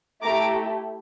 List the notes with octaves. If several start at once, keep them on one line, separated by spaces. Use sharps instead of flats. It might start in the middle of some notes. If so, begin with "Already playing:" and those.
A3 E4 G4 A#5 D6